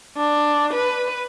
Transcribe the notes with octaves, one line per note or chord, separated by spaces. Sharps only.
D4
B4